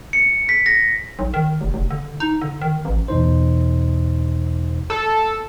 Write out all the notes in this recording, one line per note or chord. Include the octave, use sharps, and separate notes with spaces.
C#7
B6
A#6
B1
D#3
F1
F1
D3
D#4
D3
D#3
A1
E2 B2 D#4 C5
A4